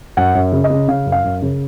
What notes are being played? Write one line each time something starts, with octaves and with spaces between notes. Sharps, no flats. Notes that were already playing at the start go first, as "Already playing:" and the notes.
F#2 F#5
F#2
C#3
D#5
C#3
C#3 F5
F#2
F5
F#2
C#3